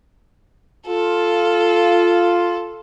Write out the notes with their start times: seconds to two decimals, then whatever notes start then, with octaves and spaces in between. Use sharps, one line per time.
0.87 F4 A4